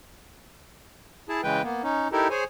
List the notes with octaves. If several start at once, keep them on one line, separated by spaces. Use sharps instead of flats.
E4 G#4 A5
C#3 E3 G#3 B4 G5
A#3 B3
C#4 D#4
D#4 E4 G4 A4 A#4
G#4 C5 C#5 G#5